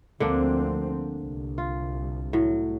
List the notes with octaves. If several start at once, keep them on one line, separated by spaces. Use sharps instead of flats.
D2 D3 F3 A#3 C4 D4
C2
F4
A2 F#3